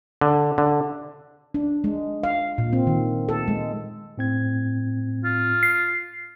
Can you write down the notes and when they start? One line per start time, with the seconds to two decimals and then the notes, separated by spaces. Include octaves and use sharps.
0.21 D3
0.58 D3
1.54 D4
1.84 G#3
2.23 F5
2.58 A#2
2.73 C4
2.87 D#3
3.29 A4
3.48 G#3
4.18 A2 C4 G#6
5.24 F4
5.63 C7